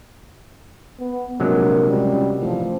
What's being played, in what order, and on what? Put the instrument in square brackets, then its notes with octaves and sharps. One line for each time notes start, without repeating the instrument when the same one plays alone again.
[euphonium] B3
[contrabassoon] A#1 [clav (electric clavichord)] C3 F#3 G#3 [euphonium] A#4
[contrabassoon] C#2 [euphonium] G3
[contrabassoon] A1 [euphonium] F3